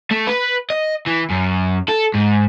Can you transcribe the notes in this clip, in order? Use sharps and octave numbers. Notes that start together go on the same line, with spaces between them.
A3
B4
D#5
E3
F#2
A4
G#2